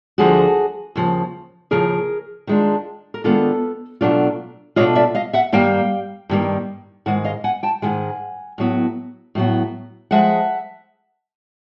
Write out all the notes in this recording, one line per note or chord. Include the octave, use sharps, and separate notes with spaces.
D2 D3 F3 F#4 G#4
D#2 C#3 F3
D#2 C#3 F3 G#4 A#4
D#3 G#3 B3 D4 F4
A#4
D#3 G#3 B3 D4 F4 A4 B4
B2 F#3 A3 D4 F4
B2 F#3 A3 D4 F4 C#5 D#5
D5 E5
D#5 F5
E5 F#5
G2 D#3 G3 A#3 F5 G5
G2 D#3 G3 A#3
G#2 D#3 G#3 F#5
D#5 F5
F#5 G#5
G5 A5
G#2 D#3 G#3 F#5 G#5
A2 F#3 B3
A2 F#3 B3
F3 G#3 E5 F#5